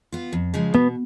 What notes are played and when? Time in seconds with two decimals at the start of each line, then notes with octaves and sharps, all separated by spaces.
0.12 B3 F4
0.33 F2
0.54 C#3 F3 G#3
0.74 B2 B3